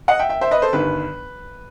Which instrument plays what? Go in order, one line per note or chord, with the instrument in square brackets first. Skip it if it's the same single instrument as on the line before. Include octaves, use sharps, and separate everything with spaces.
[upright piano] D#5 F#5
E5 G5
E5 G5
C5 E5
B4 D#5
A4 C5
G1 G2 D#3 B4